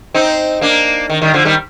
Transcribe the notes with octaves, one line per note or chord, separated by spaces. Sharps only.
C4 D#4
A#3 D4
D#3
D#3 G3
D3 F3
D#3 G3